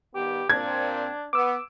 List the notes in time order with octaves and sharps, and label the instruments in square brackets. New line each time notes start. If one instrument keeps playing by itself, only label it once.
[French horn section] G2 D#3 B3 [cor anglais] G4
[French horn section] A#2 C4 [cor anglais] D4 [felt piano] G#6
[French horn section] B3 [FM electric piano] D6 E6